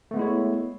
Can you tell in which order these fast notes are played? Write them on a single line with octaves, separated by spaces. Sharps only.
A3 B3 G#3 E4 C#5